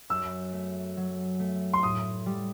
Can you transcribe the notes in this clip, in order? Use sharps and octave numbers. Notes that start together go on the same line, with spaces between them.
F#2 E6
A3
F#3
A3
C6
A2 D#6
G3